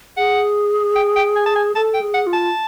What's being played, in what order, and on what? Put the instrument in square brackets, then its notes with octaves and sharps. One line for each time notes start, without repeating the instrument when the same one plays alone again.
[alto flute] G#4 [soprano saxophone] F#5
[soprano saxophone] G5
G5
G#5
A5
G#5
[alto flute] A4 [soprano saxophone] A5
[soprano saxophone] G5
[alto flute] G#4
[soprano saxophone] F#5
[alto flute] F4
[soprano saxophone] A5